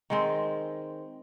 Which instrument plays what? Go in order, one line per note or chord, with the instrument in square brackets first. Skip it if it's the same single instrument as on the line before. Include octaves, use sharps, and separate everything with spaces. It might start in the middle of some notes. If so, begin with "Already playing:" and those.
[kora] D#3 G#3 C4